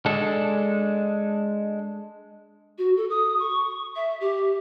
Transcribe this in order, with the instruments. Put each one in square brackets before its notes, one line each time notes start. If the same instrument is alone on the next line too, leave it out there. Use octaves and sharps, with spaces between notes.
[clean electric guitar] G#3 D4 A4
[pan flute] F#4
A4
D#6
C#6
E5
G4